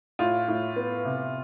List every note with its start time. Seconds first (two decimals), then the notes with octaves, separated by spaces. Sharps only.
0.19 A2 F4
0.48 A2
0.76 B3
1.05 C3